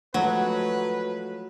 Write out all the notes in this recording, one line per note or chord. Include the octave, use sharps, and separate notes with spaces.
F3 F#3 G#3 A3 B4